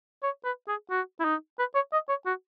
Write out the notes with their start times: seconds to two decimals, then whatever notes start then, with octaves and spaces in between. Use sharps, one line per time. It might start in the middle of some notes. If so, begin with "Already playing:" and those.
0.23 C#5
0.44 B4
0.68 G#4
0.90 F#4
1.20 E4
1.24 D#4
1.59 B4
1.75 C#5
1.93 D#5
2.09 C#5
2.26 F#4